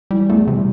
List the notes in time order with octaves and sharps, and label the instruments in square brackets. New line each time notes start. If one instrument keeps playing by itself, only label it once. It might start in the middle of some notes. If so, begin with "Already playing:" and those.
[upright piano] E3 [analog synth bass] G3
[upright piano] E2 [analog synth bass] A3
[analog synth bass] C3 [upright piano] G3